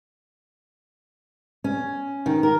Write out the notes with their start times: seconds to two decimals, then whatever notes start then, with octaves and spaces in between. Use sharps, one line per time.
1.64 C#4
2.26 D#3
2.43 A#4